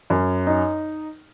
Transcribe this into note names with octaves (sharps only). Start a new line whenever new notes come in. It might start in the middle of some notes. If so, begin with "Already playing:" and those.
F#2
D#4